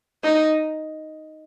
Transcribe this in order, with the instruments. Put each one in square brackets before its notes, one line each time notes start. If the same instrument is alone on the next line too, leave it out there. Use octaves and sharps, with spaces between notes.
[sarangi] D#4